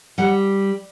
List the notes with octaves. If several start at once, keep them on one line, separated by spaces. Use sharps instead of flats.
G3 F#5